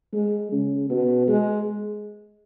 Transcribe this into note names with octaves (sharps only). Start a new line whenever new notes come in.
G#3
C#3
B2
G#3